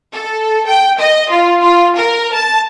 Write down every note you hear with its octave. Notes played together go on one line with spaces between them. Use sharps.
A4
G5
D#5
F4
F4
A#4
A5